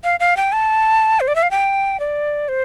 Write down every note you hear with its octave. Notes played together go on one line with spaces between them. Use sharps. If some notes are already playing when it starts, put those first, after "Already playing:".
F5
F5
G5
A5
C5
D5
E5
F5
G5
D5
C5